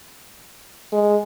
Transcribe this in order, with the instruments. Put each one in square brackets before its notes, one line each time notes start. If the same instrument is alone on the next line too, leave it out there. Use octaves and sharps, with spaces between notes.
[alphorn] G#3